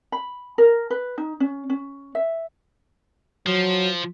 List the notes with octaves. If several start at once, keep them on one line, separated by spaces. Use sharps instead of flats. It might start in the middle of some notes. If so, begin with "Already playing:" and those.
B5
A#4
B4
D#4
C#4
C#4
E5
F3 F#3